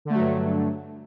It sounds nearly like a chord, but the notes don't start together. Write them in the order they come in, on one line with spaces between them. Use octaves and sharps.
D3 A3 F#3 G2